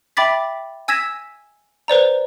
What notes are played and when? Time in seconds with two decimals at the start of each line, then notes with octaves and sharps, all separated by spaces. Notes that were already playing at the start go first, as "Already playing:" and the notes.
0.17 E5 G5 B5 D6 A6 B6
0.88 G#5 E6 G#6 A#6 B6 E7
1.88 B4 C5 D5 A#5